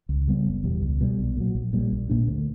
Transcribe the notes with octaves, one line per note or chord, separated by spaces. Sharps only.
C#2
C#3 G3 B3
F#1
E2 B2 G3
C#2
B2 G3
B1
A#2 F#3
A#1
A#2 G3
A#1
A#2 A#3 D4
D2